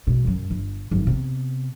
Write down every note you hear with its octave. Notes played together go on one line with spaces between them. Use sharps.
B2 G#3
F#2 C#3
G1
G#1 F#2
C3 B3